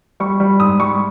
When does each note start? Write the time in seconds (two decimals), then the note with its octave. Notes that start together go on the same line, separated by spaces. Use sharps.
0.20 G3 C#6
0.40 G3
0.59 G#2 D#6
0.79 G3 C#6